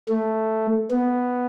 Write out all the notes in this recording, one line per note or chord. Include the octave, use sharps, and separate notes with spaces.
A3
B3